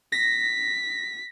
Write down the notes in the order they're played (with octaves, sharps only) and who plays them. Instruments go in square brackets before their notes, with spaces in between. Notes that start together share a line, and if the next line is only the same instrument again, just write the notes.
[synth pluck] A#6 [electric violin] B6